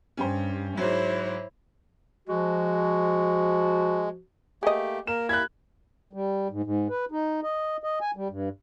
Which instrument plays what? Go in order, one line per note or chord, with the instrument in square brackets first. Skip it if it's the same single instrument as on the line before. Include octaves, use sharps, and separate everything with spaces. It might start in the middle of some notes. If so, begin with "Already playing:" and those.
[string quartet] G2 [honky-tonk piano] C#4 G4 C5
[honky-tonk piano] G#2 F#3 [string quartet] E4 C5 C#5
[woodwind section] F3 F#4 [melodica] G#3
[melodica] A3 A#3 [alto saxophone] G4 [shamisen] G#4 D#5
[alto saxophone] A#3 [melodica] A#4 [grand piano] E7
[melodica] E4 B5 [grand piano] F#6 G#6
[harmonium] G3
G#2
G#2
B4
D#4
D#5
D#5
G#5
G3
G2